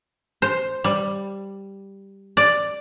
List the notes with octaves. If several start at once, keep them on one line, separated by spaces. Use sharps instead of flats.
C5
G3
D5